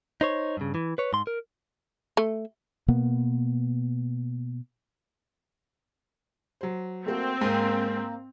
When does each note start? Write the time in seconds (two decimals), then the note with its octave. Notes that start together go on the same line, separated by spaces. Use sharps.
0.21 D#4 C5 C#5
0.57 G2 C#3
0.75 E3
0.98 B4 C#5
1.13 G#2 C6
1.27 A#4
2.17 A3
2.88 B2 A#3 B3
6.61 F#3 C5
7.06 A3 A#3 C4 F#4
7.41 G#2 A#3 G5